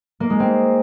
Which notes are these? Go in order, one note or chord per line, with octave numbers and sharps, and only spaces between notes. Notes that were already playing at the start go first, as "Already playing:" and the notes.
A#3
G#3
C4